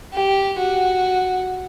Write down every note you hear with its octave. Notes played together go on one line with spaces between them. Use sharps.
G4
F#4